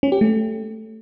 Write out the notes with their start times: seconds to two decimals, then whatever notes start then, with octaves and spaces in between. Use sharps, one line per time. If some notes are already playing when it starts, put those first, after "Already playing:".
0.03 C#4
0.12 G4
0.21 A3